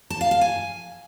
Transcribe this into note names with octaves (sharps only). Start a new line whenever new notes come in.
A5
F5
F5
G#5